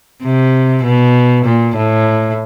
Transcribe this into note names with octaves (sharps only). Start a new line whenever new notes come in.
C3
B2
A#2
A2